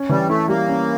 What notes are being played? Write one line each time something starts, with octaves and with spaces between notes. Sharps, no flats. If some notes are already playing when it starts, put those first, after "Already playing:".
Already playing: C#4
E3 G3
A3 E4
G3 A#3
C#4